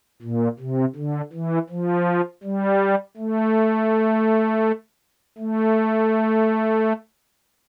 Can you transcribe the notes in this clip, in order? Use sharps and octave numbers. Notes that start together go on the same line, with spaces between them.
A#2
C3
D3
E3
F3
G3
A3
A3